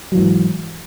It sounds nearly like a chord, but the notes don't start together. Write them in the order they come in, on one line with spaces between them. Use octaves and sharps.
F#3 E3 G#2